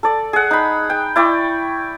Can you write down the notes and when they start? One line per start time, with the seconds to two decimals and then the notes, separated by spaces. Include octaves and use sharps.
0.03 A4 D5
0.33 G#4 F#5
0.51 D#4 B5
0.90 G5
1.16 E4 D5 G5 C#6